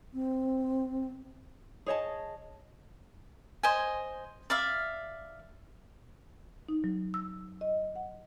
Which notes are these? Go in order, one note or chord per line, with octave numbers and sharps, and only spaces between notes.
C4
G#4 C#5 D#5 A5
C5 D#5 G#5
D5 E5 F5
D#4
F#3
E6
D#5
F#5